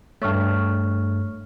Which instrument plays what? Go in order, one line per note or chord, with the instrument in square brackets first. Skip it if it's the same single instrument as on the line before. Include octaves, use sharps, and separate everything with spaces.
[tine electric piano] G2 A3 [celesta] C#5 C#6 F6